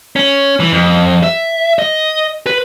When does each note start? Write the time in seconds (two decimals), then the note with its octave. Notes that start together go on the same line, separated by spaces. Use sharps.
0.16 C#4
0.60 E3
0.72 F2
1.23 E5
1.79 D#5
2.46 B4